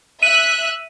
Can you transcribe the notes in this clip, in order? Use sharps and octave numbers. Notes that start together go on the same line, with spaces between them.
E5 F#6 D#7